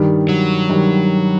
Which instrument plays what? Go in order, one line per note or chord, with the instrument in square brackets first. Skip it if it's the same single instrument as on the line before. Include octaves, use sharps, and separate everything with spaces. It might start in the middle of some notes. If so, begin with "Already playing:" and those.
Already playing: [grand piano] G2 D#3 G3
[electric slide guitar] F#3
[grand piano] G2 D#3 G3